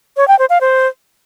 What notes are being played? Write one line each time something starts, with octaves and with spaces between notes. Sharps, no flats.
C#5
G5
C5
F5
C5